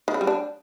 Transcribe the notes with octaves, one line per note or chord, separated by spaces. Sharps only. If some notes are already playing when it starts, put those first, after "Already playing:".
D#3
C#3
G3
D4